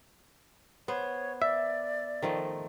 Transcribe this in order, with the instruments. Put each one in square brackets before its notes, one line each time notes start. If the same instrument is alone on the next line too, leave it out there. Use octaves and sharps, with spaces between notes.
[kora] B3 C5 [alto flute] C#5
[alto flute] D5 [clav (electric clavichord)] E5
[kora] D#3 F3 A3